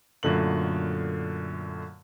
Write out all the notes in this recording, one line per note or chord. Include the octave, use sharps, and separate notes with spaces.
F#2 A#2 D3 A3 F#7